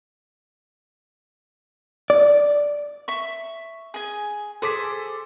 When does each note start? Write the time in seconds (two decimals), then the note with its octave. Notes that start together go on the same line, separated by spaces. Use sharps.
2.10 D5
3.08 E5 C#6
3.94 G#4 G#5
4.62 G#4 A4 C5 D6 B6